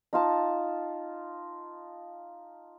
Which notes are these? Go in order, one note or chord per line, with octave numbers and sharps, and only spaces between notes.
D#4 F4 A5